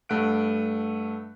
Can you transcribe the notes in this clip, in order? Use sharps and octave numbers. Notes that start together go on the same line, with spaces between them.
G2 A3 F#5 F#6 D7